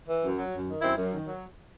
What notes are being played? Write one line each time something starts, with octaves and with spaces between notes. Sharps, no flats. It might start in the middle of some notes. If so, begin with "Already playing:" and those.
E3
F#2
F#3
F#2
D#3
F#2 C4 E4
F#2
D#3
F#3